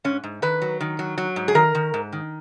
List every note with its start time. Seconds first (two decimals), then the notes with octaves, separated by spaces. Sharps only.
0.04 G#2 C#4
0.24 G#2
0.42 D#3 B4
0.62 F#3
0.80 D#3
0.99 F#3
1.18 F#3
1.36 G#2
1.48 G#4
1.55 D#3 A#4
1.75 D#3
1.94 G#2
2.12 D#3